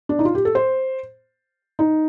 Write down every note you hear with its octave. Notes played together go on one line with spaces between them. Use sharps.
D4
D#4
F4
G4
A4
C5
D#4